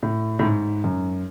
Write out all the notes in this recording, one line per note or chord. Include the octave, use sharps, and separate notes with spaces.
A2
A2
G#2
F#2